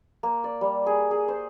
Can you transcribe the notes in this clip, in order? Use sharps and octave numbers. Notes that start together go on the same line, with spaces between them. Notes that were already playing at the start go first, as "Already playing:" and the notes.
A#3
D5
G3
G#4
G#4
C5